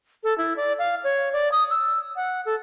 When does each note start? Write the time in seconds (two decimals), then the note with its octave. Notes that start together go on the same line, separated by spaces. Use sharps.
0.24 A4
0.38 E4
0.57 D5
0.79 F5
1.04 C#5
1.33 D5
1.52 D#6
1.70 E6
2.16 F#5
2.45 A4